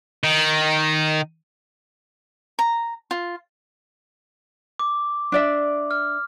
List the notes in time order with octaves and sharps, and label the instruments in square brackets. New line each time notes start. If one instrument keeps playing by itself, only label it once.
[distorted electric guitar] D#3
[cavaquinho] A#5
F4
[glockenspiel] D6
[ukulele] D4 D5 E5
[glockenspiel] F6